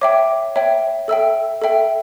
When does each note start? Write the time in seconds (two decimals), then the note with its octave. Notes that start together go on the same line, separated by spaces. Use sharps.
0.01 C#5 E5 G5 D6
0.56 C#5 E5 G5
1.08 A4 E5 G5 E6
1.62 A4 E5 G5